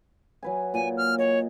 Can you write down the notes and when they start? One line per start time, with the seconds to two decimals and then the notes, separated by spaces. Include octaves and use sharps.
0.43 F#3 B4 G#5
0.74 A#2 G#5
0.97 F6
1.18 C#5 D#5